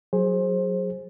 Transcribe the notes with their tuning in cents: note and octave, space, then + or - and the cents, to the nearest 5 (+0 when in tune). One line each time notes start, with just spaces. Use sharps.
F#3 +0 G#4 +0 C5 +20